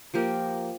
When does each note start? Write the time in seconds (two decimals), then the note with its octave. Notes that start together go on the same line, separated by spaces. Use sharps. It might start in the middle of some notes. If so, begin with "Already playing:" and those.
0.14 F3 A#3 G4 A#4